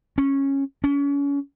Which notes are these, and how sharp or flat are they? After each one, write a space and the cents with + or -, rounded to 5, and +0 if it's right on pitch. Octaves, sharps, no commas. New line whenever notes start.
C#4 -10
C#4 +35